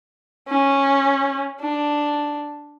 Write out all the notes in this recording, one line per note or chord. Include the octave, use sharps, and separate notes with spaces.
C#4
D4